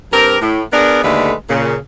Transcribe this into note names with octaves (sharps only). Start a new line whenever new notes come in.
G2 C4 G4 A#4
A2
B3 D4 G#4 A#4
D#2 D3 G#3 A3 B4
A#2 C#3